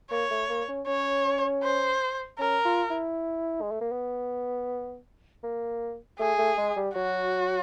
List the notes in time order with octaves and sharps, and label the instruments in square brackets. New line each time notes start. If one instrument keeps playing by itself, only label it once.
[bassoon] A#3 [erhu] C#5
[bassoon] A3
A#3
C#4
[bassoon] C#4 [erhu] C#5
[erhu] C5
[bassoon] C#4 [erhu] A#4
[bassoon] F4
E4
G#3
A3
A#3
B3
A#3
[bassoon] A3 [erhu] G#4
[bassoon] A3
G#3
G3
[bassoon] F#3 [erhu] F#4